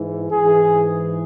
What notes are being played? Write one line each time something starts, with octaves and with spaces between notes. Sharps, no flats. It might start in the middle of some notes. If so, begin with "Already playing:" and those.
Already playing: G#2 E3
G#2 E3 G#4